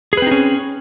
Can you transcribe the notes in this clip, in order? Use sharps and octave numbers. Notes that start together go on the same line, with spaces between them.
C4 C#4 D#4 G#4 B4